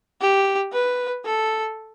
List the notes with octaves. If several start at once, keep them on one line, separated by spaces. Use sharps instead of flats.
G4
B4
A4